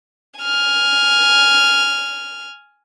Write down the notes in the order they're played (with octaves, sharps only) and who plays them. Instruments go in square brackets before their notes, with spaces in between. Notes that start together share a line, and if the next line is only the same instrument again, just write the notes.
[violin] G#5 F6